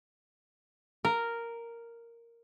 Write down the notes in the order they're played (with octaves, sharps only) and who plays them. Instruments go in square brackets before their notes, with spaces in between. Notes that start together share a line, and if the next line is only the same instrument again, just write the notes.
[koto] A#4